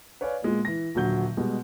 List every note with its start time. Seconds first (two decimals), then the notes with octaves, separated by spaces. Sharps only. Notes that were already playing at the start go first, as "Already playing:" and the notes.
0.21 B4 C#5 D5 F5 G#5
0.42 A#2 G#3 B3
0.65 E3 A#6
0.95 D#1 D3 F#3 G6 G7
1.37 B2 G3 G#3